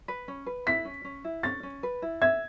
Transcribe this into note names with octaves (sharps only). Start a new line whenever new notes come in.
B4
C#4
B4
E4 B6
C#4
C#4
E4
C#4 A6
C#4
B4
E4
E5 G#6